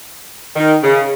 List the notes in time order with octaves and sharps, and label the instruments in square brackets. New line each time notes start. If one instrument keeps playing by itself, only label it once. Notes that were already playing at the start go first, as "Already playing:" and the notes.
[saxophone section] D#3
C#3